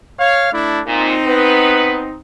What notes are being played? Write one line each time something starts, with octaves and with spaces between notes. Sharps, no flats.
C#5 F5
A3 D4 E4
A#2 C4 D#4
B3 B4